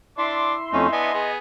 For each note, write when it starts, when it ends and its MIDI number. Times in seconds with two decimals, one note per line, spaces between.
0.18 0.55 62
0.18 1.27 64
0.18 1.27 76
0.18 1.27 84
0.18 0.55 86
0.73 0.87 41
0.73 0.87 57
0.73 0.87 61
0.73 0.89 63
0.92 1.13 59
0.92 1.13 62
0.92 1.30 75
0.92 1.13 80
1.14 1.38 59
1.14 1.38 68